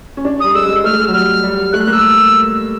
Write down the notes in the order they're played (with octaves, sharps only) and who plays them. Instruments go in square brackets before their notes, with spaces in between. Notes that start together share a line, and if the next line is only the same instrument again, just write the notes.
[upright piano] C#4
D4
[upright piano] G3 [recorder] D#6
[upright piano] G#3 [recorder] E6
[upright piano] G3
G#3
[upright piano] A3 [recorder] F6
[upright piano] G#3
F#3
[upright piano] G3 [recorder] F6
[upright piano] G3
[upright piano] A3 [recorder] F#6
[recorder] F#6
[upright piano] A#3
[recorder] E6